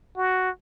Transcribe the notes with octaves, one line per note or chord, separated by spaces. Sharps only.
F#4